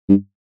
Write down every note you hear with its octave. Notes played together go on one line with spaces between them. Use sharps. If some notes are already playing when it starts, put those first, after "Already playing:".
G2